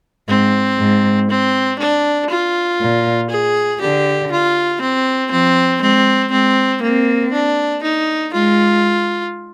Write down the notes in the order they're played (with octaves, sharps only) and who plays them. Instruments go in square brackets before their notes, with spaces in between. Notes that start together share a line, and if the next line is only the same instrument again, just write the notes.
[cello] G#2 [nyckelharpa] C4
[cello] G#2
[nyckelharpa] C4
D4
F4
[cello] A#2
[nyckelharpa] G#4
[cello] D3 [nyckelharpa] G4
[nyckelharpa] F4
C4
[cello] F3 [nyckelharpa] C4
[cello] G#3 [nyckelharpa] C4
[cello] G#3 [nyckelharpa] C4
[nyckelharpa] A#3 [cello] C4
[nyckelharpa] D4
D#4
[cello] G#3 [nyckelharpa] F4